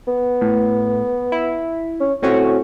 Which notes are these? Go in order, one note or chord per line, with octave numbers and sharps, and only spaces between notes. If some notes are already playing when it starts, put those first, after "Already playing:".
B3
A2
E4
C#4
A2 C4 C#4 F#4